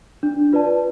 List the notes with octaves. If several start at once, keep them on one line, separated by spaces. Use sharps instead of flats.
D4
F4 B4 D5 A5